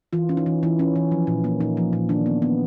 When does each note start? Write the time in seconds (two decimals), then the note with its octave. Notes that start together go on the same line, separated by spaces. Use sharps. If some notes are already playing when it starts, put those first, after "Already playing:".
0.13 E3 F4
0.29 C#4
0.37 D#4
0.46 E3
0.63 E3 E4
0.79 C#4
0.96 E3
1.12 F3
1.27 A#2
1.44 A#3
1.60 A#2 D#4
1.77 F3
1.93 A#2
2.09 D#3 D4
2.26 B3
2.42 B3